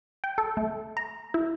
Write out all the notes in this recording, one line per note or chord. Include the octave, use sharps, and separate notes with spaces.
G5
A4
A3
A#5
E4